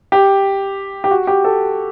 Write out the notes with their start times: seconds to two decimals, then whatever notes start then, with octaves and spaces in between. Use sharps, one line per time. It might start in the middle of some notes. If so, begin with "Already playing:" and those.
0.12 G4
1.04 G4
1.11 F#4
1.27 G4
1.44 A4